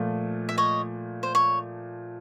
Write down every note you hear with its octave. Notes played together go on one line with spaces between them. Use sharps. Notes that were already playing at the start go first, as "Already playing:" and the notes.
Already playing: A#2 F3 A3
E5
C#5 D#5
C5
C#5